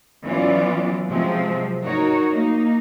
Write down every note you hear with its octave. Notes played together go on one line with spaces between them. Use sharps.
E3 F#3 B3 C#4 F4 D5
C3 F3 F#3 G#3 C4
D#4 F#4 A#4 C#5
A#3 D#4